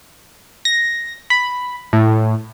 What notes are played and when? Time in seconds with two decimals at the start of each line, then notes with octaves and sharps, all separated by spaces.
0.65 A#6
1.30 B5
1.93 A2